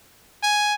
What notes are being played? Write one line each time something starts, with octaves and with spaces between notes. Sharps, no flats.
G#5